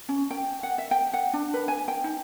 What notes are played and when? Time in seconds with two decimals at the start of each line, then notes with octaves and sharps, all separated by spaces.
0.09 C#4
0.31 G5
0.63 F#5
0.78 E5
0.91 G5
1.14 F#5
1.33 D4
1.54 B4
1.68 G#5
1.88 G5
2.04 D#4